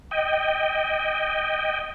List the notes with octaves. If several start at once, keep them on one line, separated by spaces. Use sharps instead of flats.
D#5 G5